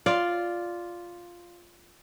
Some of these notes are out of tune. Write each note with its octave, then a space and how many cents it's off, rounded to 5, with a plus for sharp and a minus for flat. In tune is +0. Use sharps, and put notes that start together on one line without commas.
F4 +0 D5 +0